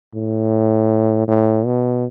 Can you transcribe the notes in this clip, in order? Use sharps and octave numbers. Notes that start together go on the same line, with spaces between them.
A2
A2
B2